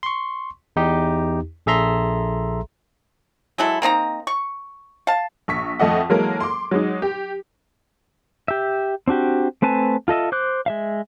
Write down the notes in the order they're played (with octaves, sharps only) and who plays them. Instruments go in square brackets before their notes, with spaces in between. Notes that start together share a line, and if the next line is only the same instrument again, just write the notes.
[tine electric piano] C6 C#6
E2 D#4 G4
A#1 G#4 A4 E5 A#5 C6
[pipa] F#3 G#3 E4 A4
A#3 C4 D#4 A#5
C#6
F5 A5
[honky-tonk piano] A#1 C#6 B6
F2 A3 D#5 F#5
E3 F#3 G#3 A#3 A4 A#4
C6 D6
F#3 G#3 D#4
G4
[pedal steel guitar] G4 E5
C4 D4 F#4 G4
A3 C4 B4 G#5 A5
F4 A4 D#5 E5
C5 D6 F#6
G#3 E5 F5